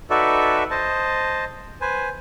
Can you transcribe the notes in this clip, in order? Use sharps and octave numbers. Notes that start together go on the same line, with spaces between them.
D#4 F#4 A4 B4 D5 E5
C5 D#5 A5
B4 C5 G#5